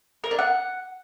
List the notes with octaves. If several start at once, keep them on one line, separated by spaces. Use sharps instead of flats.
A#4
D4
F#5